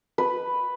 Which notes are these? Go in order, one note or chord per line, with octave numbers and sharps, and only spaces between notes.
B4